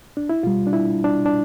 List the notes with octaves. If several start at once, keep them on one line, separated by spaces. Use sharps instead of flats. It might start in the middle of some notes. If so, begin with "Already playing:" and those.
D4
E4
B2 G3 F4
D4
E4
D4
D4